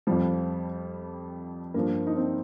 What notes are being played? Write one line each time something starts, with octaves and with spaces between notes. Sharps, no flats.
F2 F3 G3
G2 F3 A#3
D#4
C4